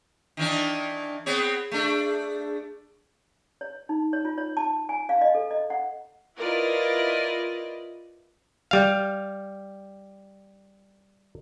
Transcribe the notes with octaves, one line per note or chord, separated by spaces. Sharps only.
D#3 E3 D4
B3 C4 G#4 C#5
A3 D4
C#5
D#4
C#5
F4
C#5
A5
G#5
F5
D#5
A4
D#5
F#5
E4 F4 A#4 B4 D5 D#5
G3 F5